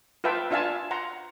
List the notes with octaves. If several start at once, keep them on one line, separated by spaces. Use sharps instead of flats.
F4 B4 E5 G5 A5
D4 F4 E5 F5 G#5 A5
F#5 A#5 C6